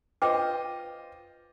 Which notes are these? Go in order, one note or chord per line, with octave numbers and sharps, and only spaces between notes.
F4 B4 C5 D#5 G5 D6